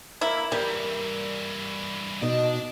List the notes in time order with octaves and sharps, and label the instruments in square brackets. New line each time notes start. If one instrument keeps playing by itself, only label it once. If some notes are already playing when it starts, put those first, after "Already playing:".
[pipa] A#3 E4
[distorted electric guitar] G2 E3 [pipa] G3 [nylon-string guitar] A#4
[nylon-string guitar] B2 D#4 D#5 [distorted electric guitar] D4 A5